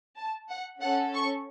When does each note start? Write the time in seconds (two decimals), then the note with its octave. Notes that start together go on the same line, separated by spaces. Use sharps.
0.18 A5
0.50 F#5
0.81 C#4 A4 F#5
1.14 C#6